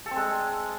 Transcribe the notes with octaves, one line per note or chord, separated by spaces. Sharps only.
A4
C4
G#3